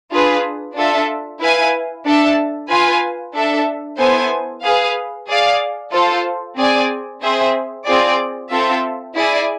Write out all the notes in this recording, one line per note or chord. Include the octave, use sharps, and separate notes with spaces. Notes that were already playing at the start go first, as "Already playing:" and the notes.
D4 F4 G#4 B4
D4 F4 A4 E5
E4 B4 F5 G#5
D4 A4 E5 A5
F4 B4 F5 G#5
D4 A4 E5
B3 E4 A4 C5 G#5
G#4 B4 F5
G#4 D5 F5
F4 A4 C5
C4 G#4 D5 G#5
C4 G#4 C5 E5
C4 F4 G#4 D5
C4 F4 A4 E5
E4 G#4 D5 G#5